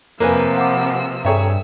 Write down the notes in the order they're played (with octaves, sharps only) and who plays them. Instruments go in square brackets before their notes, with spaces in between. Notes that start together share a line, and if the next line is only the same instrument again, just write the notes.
[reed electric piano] F2 [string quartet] C3 F3 E6 [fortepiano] A#3 B4 G#5
[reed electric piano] F#5 D6
[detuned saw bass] G2 [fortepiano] G#4 C#5 E5 [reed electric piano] A4 G5 A#5 [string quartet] E6